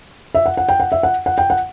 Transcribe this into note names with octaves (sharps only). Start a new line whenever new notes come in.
E5
F#5
F#5
G5
F#5
E5
F#5
F#5
G5
F#5